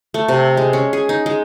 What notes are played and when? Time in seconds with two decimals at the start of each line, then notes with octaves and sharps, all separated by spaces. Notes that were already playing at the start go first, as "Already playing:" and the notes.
0.14 A3
0.28 C3
0.57 G#3
0.73 C#4
0.93 G#4
1.09 D#4
1.26 G#3